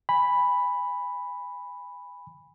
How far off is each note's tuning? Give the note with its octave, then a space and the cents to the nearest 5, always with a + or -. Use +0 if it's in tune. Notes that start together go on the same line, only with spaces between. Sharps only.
G#5 -25 B5 +0